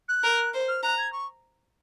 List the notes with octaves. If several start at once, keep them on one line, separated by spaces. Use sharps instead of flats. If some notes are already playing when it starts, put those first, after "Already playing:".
F#6
A#4
C5
F6
A#5 F#6
G#6
C#6